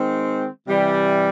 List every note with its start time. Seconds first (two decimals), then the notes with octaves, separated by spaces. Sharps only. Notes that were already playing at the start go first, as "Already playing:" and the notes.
Already playing: D#3 G#3 C4
0.66 C3 E3 G3